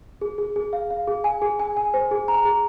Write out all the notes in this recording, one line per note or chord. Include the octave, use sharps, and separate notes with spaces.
G#4
G#4
G#4
F5
F5
G#4
G#5
G#4
G#5
G#5
C5
G#4
A#5
G#4